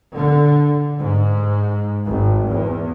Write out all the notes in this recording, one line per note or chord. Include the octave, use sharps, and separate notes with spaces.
D3
G#2
G#1
E2